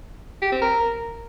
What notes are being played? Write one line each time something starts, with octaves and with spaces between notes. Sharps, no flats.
G4
C4
A#4